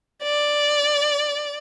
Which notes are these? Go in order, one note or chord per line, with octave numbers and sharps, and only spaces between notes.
D5